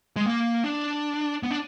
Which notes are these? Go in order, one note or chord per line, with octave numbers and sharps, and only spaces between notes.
G#3
A#3
D4
B3
D4